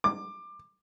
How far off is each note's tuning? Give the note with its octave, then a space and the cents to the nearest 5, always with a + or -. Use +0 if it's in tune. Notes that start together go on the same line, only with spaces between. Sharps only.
D6 +20